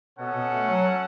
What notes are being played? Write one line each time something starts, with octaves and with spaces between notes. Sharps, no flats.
B2 B3 C#4 A4 C#5 F#5
B2 B3
A3
F#3